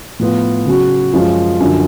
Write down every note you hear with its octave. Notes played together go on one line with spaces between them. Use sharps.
A2 F3 B3 F4
C#3 F#3 C#4 F#4
F#2 F3 G#3 C#4 F4
F#2 D3 F3